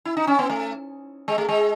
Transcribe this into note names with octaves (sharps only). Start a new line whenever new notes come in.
E4
D#4
C#4
B3
A3
G#3
A3
G#3